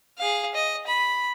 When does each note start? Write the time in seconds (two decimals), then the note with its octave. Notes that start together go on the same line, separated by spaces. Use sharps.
0.19 G#4 F5
0.55 D#5
0.87 B5